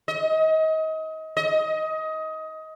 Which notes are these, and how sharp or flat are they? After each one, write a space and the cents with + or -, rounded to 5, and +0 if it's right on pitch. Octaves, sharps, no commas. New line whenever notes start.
D#5 +30
D#5 +20